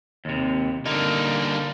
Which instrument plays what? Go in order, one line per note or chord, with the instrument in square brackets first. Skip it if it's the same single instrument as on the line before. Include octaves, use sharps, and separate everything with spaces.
[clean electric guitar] D#2 C3
[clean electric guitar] D3 A#3 [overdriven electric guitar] G3 D#4